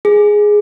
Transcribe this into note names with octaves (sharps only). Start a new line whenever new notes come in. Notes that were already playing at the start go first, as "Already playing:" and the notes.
G#4